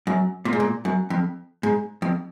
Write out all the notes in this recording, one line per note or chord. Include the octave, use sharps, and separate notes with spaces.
F#2
A#2
G#2
A#2
F#2
F2
G#2
F2